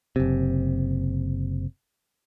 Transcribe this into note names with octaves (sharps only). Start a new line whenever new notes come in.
F#1 C3